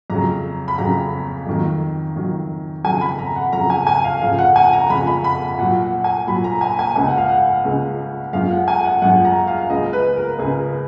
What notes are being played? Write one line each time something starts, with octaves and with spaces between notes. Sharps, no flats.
F2 C#3 F#3 A#5
B5
F2 C#3 F#3 A#5
F2 D#3 F#3
F2 D#3 F#3
F2 C#3 F#3 G#5
B5
A#5
F#5
F2 C#3 F#3 A#5
G#5
G#5
F5
F2 C#3 F3 F5
F#5
G#5
A#5
F2 C#3 F3 B5
B5
B5
A#2 F#3 F#5
F#5
G#5
A#2 F#3 B5
A#5
G#5
G#5
C#2 C#3 G#3 G#5
F#5
F5
F#5
C#2 C#3 G#3
F#2 F3 G#3 F5
F#5
G#5
F#5
F#2 F3 G#3 F#5
A#5
F5
C#2 C#3 G#3 D#5
B4
A#4
C#2 C#3 G#3 G#4